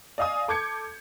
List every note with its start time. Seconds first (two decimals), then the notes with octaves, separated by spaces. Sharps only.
0.18 D5 D#5 F5 G#5 D#6
0.48 A4 D6 G6 G#6 C#7